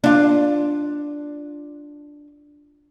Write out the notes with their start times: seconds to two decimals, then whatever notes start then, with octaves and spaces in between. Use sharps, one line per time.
0.04 D4 F4